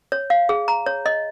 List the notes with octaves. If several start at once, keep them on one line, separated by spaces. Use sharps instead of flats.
C#5
F5
G#4
A#5
C#5
D#5